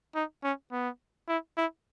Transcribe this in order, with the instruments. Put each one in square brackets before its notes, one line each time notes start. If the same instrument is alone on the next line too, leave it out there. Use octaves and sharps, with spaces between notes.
[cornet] D#4
C#4
B3
E4
E4